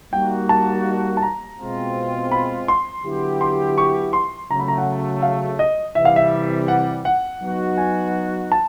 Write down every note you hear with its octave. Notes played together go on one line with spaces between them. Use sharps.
G3 A#3 D#4 F#4 G5
A5
A5
A#5
B2 G#3 C4 F4
B5
C6
D3 F#3 B3 E4 G4
C6
C#6
C6
C#3 F#3 A3 A#5
B5
A#5
F#5
F5
D#5
C3 E3 G3 E5
F5
E5
F#5
F#5
F#3 B3 D#4 F#4
G#5
A5